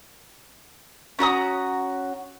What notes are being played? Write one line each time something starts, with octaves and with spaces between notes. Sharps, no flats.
C#4 F#4 A#5 D#6